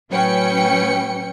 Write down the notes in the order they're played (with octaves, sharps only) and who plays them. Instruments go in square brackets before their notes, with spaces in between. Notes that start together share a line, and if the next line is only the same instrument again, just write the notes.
[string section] A2 F#3 C#4 B4 G5 C#7